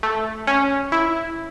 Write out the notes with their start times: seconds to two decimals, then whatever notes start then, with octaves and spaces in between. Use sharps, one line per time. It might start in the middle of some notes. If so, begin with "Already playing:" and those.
0.03 A3
0.47 C#4
0.92 E4